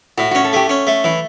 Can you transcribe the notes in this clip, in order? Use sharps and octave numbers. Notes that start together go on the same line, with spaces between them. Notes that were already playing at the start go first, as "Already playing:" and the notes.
A2 F#4
C#4 F#4
A4
A3 G4
C#4
A3
E3